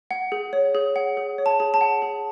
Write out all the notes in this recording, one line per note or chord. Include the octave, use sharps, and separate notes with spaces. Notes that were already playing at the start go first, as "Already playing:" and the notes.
F#5
G#4
C#5
G#4
F#5
G#4
C#5
A5
G#4
A5
F#5
G#4